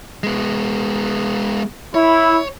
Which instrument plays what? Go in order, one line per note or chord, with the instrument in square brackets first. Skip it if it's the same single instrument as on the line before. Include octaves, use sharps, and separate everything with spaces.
[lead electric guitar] G#3 B3
[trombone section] E4 [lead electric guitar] C#5